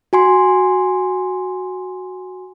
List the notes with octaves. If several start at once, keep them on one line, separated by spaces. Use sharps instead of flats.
F#4 G#5 C6